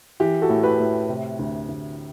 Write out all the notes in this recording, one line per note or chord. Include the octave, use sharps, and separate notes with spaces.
E3 G4
F#4 A4
A2
G4 B4
A2
C3
D2
D2